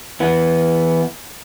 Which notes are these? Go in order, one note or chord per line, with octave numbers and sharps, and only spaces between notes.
E3 B3